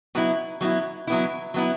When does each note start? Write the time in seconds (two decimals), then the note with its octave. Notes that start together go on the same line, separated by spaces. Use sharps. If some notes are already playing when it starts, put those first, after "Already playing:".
0.15 F#3 B3 E4
0.61 F#3 B3 E4
1.07 F#3 B3 E4
1.54 F#3 B3 E4